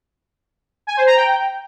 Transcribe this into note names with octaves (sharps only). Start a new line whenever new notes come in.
G#5
C5
A#5
G5